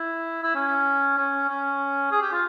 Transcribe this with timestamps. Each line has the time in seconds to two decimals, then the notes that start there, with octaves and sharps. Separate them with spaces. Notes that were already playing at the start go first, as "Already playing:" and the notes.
Already playing: E4
0.43 E4
0.55 C#4
1.17 C#4
1.49 C#4
2.11 G#4
2.21 G4
2.32 F4